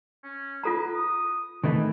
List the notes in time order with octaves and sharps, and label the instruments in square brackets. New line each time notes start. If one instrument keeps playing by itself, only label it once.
[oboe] C#4
[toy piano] F4 A4 A#5 [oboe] B4
[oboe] D#6
[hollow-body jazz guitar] D#3 E3 A3 [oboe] B4